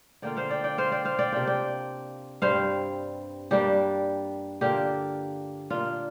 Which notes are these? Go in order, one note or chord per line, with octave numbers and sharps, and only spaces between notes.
D3 A#3 F4 D5 G5
C5 F5
D5 G5
D5 G5
C5 F5
D5 G5
C5 F5
D5 G5
C3 A#3 D4 F4 G5
D5 G5
G2 G3 C4 C5 F5
G2 G3 A#3 D4 G4
D3 A#3 D4 F4 G4
A#2 A#3 D4 F4